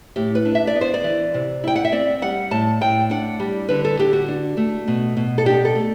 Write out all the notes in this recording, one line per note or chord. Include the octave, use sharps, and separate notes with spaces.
A2 G4
B4
D4
E5
D5
B3
C5
D5
E3
C3
E4 G5
F#5
E5
C4 D5
G3 F#5
A2 A5
A2 G5
D4 F#5
G3
D3 B4
A4
D3 G4
F#4
D4
A3
B2
B2
A4
D4 G4
A4
A3